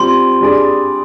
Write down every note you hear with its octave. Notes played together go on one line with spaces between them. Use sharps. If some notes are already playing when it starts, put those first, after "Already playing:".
Already playing: G3 C4 F4 C6
G3 D4 G#4 D5